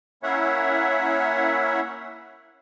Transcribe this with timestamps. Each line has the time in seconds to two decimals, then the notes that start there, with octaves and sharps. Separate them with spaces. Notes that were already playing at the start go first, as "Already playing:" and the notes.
0.23 A#3 C#4 E4 C#5 E5 F#5